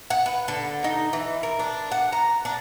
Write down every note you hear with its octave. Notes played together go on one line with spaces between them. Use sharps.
F#5
B4
D3
D#4
E3
A#4
D4
F#5
A#5
D4